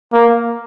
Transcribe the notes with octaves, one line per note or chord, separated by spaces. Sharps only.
A#3